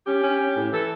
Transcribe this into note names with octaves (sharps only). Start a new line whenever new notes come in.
C#4 G4
C#4
C#4
A2
E3 A4